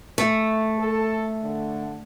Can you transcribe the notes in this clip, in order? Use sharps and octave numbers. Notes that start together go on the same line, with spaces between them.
A3
A4
D3